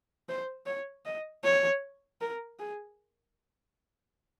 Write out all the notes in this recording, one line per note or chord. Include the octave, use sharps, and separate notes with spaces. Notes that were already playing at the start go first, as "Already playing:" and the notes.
C5
C#5
D#5
C#5
A#4
G#4